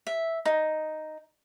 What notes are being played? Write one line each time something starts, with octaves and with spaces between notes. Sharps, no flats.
E5
D#4